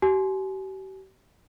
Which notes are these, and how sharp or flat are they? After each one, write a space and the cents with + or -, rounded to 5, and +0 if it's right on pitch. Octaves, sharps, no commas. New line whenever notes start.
G4 -40 G#5 +30